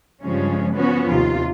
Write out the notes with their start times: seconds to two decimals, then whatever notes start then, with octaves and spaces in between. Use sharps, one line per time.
0.22 G2 C#3 F3 G3 G#3 C#4
0.74 F3 B3 C#4 F#4
1.07 D#2 C3 F4